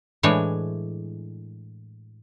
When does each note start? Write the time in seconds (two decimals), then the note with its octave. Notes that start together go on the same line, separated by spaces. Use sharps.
0.23 A2 E3 G#3 D4 C#5